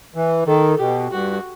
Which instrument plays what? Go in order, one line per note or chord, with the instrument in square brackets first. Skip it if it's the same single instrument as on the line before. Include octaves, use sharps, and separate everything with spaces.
[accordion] E3
[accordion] D#3 [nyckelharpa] A4
[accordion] B2 [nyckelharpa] G4
[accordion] G2 [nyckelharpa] F#4